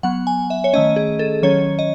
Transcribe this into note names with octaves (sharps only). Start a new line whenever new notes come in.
F#3 B3 F#5
G#5
E5
C#5
D#3 A3 C#4 D#5
G#4
A4
D#3 F#3 C#4 C#5
D#5